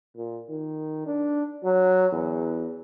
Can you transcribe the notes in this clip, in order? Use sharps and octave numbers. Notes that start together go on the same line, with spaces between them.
A#2
D#3
D4
F#3
E2